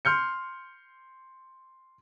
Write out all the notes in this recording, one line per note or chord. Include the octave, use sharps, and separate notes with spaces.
C6 F6 G6 C#7